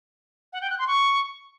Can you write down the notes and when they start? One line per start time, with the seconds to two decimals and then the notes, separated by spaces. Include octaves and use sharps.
0.53 F#5
0.61 G5
0.70 F#6
0.79 C6
0.87 C#6